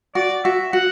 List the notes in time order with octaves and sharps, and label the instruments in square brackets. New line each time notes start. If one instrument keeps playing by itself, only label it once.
[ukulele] F#4 [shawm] D5
[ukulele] F#4 [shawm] E5
[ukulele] F#4 [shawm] F#5